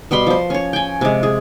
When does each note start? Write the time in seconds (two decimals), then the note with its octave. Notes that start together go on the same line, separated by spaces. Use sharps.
0.11 B2 G3 B5 C6
0.27 F3 C5
0.50 C#4 C#5
0.73 G5 G#5
1.01 C3 G#3
1.23 G#4